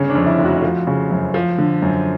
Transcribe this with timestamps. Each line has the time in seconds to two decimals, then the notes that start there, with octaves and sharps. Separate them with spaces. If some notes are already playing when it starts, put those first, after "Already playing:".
Already playing: G1 C#3 C#4
0.10 D4
0.15 F2
0.26 E4
0.38 F1
0.45 F#4
0.62 F3
0.87 C#3
1.11 F#2
1.34 F3
1.58 D3
1.82 F#2